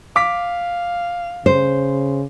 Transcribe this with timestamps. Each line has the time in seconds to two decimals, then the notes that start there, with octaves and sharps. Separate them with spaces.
0.16 F5 D6 B6
1.46 C#3 C5